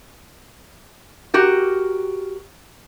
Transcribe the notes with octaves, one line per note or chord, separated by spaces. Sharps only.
F#4 G4 A#4